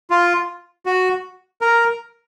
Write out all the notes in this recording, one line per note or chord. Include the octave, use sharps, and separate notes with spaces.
F4
F#4
A#4